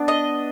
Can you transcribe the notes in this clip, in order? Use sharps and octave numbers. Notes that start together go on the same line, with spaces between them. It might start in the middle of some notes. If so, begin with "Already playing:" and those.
Already playing: B3 D4
D#5